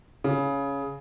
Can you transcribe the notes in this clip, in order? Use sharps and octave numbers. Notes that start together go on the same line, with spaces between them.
C#3